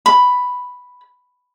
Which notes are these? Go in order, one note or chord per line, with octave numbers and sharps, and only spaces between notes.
B5